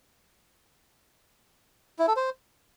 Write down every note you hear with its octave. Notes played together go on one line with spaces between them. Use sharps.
E4
A4
C5